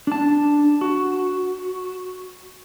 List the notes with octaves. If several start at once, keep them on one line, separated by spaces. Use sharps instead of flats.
D4 A5
F#4